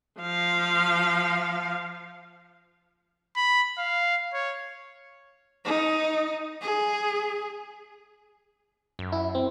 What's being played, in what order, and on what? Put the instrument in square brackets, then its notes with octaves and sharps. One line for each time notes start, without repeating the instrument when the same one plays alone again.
[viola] F3 F5
[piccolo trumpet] B5
F5
C#5
[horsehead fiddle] D#4
G#4
[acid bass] F#2
[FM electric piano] E4
C4